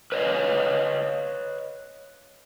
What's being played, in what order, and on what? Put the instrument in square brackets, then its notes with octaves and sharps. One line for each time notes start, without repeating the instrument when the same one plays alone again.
[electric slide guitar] B4 C#5 D#5 F5